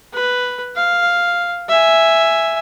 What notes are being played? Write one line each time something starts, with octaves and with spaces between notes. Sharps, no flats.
B4
F5
E5 G#5